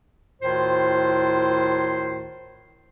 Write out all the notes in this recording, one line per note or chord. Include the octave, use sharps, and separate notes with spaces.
D2 A2 D#3 E4 F4 C5